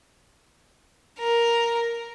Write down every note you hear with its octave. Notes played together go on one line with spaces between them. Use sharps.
A#4